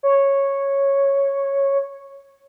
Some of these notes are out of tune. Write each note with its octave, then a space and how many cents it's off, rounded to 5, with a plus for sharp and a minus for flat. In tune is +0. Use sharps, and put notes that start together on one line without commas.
C#5 -5